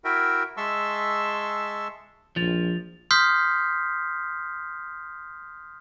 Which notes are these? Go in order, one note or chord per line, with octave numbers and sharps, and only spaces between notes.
E4 F#4 A#4 E5 G5
G#3 E5 A5 C6 C#6 E6
A#1 F3 A6 F7
C6 D#6 F6 G6 B6 C7